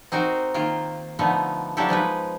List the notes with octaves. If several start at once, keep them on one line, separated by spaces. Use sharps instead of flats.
C4 D#4 F#4 A#4 C5
D#3 A#3 F4
D3 F3 A3 B3 D#4
C#3 F#3 D4 E4 G4 A4
F3 G#3 D#4 B4